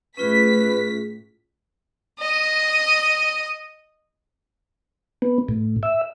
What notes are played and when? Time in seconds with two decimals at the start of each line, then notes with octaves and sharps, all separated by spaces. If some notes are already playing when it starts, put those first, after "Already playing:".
0.17 A2 C#4 F4 G#4 B4 B6
2.18 D#5 D#6
5.22 B3
5.48 A2
5.83 E5